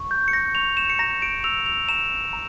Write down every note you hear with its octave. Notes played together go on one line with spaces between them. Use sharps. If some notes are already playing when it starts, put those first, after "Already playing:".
Already playing: C#6
G6
C#7
A#6
C#6 F7
E7
C#7
A#5 A#6
D7
E6 F7
F7
A#5 E7
A#5